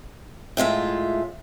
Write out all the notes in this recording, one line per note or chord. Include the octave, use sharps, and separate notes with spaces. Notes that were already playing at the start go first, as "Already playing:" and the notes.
A2 G#3 F4 E5